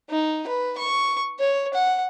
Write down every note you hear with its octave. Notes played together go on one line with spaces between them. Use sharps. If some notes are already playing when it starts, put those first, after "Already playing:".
D#4
B4
C#6
C#5
F#5